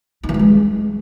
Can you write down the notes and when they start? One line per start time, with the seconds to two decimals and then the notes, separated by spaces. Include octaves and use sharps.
0.23 D#4
0.29 E3
0.34 G3
0.39 G#3